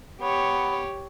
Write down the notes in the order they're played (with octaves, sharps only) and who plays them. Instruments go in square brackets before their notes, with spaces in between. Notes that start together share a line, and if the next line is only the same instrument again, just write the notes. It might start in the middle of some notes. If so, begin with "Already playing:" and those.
[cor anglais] B3 [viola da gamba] G4 C#5